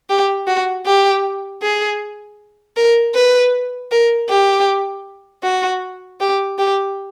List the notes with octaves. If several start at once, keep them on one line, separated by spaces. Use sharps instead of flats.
G4
F#4
G4
G#4
A#4
B4
A#4
G4
F#4
G4
G4